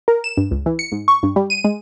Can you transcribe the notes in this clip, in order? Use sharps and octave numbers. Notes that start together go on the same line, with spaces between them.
A#4
E7
G2
C#2
E3
C#7
G#2
C#6
G2
G3
D#7
G#3